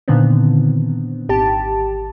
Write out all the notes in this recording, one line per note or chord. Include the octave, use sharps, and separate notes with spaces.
A#2 D3 D#3 B3 C4
G#1 G4 A5